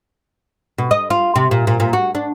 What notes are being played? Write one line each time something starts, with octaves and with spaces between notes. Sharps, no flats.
B2
D#5
F4
C3
A#2
A#2
A#2
F#4
D4